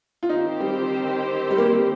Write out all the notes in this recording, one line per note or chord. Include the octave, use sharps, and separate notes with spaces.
F4
D#3 C4 D#4 G4 C5
G3
G3
A#3
G3